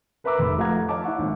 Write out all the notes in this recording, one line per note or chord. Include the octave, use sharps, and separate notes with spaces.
A#4 B4 E5 A#5 D6 E6
F1 B5
F3 A3 F5 F#5 A#5 G#6
C#5 D#5 F5 A5 D6
E4 E5 F#5 C#6
G#1